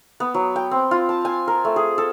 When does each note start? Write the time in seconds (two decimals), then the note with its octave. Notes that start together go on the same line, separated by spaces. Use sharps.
0.20 B3
0.34 F#3
0.56 G5
0.71 C4
0.91 F4
1.09 A5
1.25 G#5
1.48 A#4
1.65 A3
1.76 G#4
1.98 A4